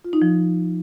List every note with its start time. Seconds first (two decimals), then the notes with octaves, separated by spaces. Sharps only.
0.05 F4
0.13 D#4
0.22 F3